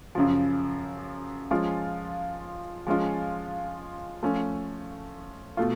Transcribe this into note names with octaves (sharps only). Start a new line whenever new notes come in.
F#2 C#3 F3
F3 G#3 C#4 F4
F3 G#3 C#4 F4
F3 A3 C#4
B2 A3 F4